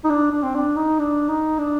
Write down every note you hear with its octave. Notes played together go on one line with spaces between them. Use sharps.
D#4
D4
D4
C4
D4
D#4
D4
D#4
D4